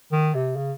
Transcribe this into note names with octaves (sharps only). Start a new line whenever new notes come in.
D#3
C3
C#3